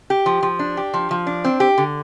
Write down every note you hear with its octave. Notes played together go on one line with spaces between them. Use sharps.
G4
F3
F3
D4
G4
F3
F3
D4
C4
G4
D3